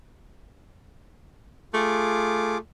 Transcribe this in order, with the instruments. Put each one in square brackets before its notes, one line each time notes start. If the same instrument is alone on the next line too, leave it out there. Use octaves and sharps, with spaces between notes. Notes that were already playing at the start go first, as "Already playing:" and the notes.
[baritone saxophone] A3 [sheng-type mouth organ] F4 G#4 D6